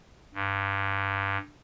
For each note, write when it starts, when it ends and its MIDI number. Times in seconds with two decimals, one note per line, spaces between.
0.35 1.38 43